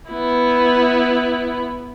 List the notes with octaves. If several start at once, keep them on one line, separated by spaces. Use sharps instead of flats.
B3 E4